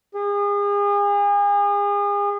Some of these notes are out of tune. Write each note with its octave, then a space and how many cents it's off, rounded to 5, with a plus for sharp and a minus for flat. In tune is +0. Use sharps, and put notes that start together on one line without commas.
G#4 -35